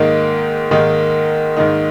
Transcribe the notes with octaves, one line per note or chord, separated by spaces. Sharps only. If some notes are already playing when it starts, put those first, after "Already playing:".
Already playing: G#2 D#3 A#3 D#4
G#2 D#3 A#3 D#4
G#2 D#3 A#3 D#4